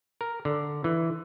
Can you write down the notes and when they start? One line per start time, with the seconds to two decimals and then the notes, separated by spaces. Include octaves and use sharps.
0.21 A#4
0.45 D3
0.84 E3